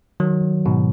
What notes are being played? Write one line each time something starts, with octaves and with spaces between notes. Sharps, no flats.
D#3 F#3
G#2 B2